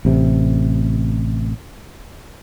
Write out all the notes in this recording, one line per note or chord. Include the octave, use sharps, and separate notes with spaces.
A1 C3